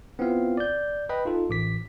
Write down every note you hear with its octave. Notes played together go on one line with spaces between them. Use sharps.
B3 C4 E4 F4 F5
D5 G6
B4 D#5 G5 B5
D#4 F4 A4
A1 D6 B6